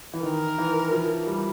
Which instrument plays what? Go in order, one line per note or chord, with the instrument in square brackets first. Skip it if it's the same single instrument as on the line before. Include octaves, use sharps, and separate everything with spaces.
[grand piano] E3
[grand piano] D#3 [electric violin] A#4
[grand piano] E3
F3
G3